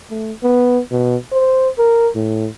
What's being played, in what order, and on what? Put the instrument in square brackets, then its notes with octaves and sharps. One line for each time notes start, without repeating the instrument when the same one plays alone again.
[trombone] A3
B3
B2
C5
A#4
A2